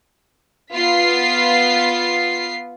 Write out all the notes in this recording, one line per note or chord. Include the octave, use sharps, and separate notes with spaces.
B3 F4 B6 C7